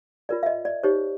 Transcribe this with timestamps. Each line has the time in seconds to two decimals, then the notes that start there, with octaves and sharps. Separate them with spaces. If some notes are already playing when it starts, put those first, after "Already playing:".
0.29 F4 A#4 C#5 D5
0.43 E5
0.46 D#5
0.65 D5
0.83 D#4 G4 C5 C#5